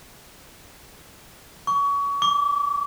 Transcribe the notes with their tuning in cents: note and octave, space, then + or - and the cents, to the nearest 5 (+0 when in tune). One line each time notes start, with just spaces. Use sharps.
C#6 +30
D6 -30